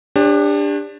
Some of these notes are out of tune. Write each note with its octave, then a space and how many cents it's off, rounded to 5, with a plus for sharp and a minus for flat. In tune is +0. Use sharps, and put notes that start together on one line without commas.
D4 +0 G4 +35 C#5 -35